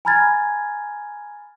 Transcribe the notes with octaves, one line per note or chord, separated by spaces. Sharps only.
G#5 A#5 B5 F6 G#6 A6